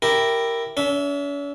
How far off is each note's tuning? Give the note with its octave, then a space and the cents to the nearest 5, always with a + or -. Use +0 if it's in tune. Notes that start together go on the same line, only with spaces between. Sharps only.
E4 +0 G4 +0 A#4 -5
C#4 +45 E5 +0